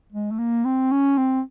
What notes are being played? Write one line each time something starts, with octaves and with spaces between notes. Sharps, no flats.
G#3
A3
A#3
C4
C#4
C4